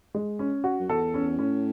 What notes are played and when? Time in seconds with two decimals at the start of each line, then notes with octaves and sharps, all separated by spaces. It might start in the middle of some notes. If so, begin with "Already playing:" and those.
0.15 G#3
0.39 C#4
0.64 F#4
0.80 F#2
0.89 E2 A4
1.14 C#4
1.39 A2 C#4